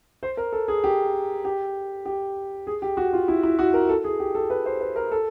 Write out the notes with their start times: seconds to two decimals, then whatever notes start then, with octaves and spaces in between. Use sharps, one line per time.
0.23 C5
0.37 A#4
0.53 A4
0.68 G#4
0.84 G4
1.45 G4
2.06 G4
2.67 G#4
2.82 G4
2.97 F#4
3.13 F4
3.28 E4
3.43 E4
3.59 F#4
3.74 A#4
3.89 A4
4.04 G#4
4.20 G4
4.35 A4
4.50 B4
4.65 C5
4.81 B4
4.96 A#4
5.11 A4